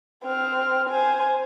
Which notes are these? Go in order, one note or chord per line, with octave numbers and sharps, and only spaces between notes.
C4 F6
C5 G#5